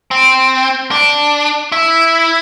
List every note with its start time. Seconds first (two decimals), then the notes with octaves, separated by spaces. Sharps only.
0.11 C4
0.91 D4
1.72 E4